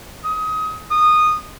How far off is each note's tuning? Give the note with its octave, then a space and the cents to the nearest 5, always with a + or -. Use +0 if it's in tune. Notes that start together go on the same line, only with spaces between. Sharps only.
D#6 +25
D#6 -15